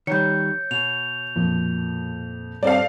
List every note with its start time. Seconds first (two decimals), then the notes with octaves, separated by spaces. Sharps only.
0.07 D#3 G3 C#5 G6 C#7
0.71 B2 F7
1.36 F2 A#2
2.63 G2 C4 A4 D5 F5